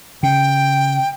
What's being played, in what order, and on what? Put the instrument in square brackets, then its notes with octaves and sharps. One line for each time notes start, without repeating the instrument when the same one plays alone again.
[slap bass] C#3 [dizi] G5